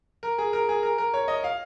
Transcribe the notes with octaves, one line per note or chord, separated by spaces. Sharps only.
A#4
G#4
A#4
G#4
A#4
A#4
C#5
D#5
F5